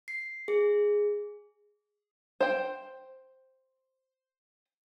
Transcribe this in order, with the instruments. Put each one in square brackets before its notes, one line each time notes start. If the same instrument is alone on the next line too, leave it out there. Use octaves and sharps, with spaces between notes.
[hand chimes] C7
G#4
[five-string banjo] C5 G5